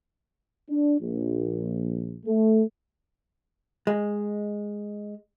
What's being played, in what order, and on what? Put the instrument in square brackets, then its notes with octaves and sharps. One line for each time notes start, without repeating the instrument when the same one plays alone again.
[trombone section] D4
A#1
A3
[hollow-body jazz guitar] G#3